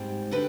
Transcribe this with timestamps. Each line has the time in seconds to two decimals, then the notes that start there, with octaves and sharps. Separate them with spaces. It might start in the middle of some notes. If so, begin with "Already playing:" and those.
Already playing: G#2 G3 C4
0.31 D3 G4 B4